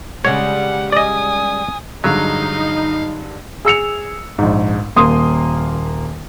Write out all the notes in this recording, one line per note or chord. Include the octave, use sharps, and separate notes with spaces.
C#3 G3 G#3 C#5 F#5
D5 D#5 G#5 D#6
G2 D3 F#3 G#3 D#4 F5
G#4 E6 C#7 F7
A#1 G#2
D#1 A#3 C6 D#6